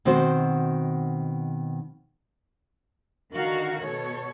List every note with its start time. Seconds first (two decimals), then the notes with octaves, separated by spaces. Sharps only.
0.05 B2 D#3 C4 F#4 C5
3.33 D3 D#3 D#4 F#4 A#4 F5
3.81 B2 A4 C#5